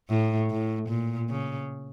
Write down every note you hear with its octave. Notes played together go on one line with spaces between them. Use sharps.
A2
A2
A#2
C#3